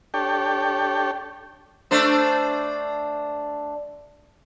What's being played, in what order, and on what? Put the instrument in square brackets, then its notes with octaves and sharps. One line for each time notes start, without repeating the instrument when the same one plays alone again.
[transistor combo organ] D4 G4 A4 C#5 G5
[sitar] A3 D4 C5